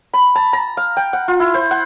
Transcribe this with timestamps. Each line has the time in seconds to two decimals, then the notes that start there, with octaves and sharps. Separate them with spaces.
0.13 B5
0.35 A5
0.53 A#5
0.77 F5
0.97 G5
1.13 F#5
1.28 F4
1.40 E4
1.54 C5
1.71 F#5